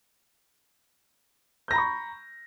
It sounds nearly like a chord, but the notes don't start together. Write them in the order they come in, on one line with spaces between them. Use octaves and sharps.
G6 A#6 A#5 B5 C#6